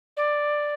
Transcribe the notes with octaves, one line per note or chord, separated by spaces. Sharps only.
D5